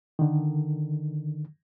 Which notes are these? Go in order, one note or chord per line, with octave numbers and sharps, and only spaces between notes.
D3 D#3